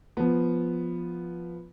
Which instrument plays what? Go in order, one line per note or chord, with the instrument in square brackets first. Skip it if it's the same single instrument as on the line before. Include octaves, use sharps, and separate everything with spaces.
[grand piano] F3 B3